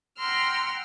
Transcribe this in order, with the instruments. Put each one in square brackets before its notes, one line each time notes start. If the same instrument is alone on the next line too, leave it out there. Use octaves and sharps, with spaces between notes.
[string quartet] F#5 G5 A#5 C6 E6 F6